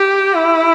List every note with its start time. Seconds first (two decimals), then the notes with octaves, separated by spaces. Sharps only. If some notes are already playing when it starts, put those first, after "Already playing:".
Already playing: G4
0.34 E4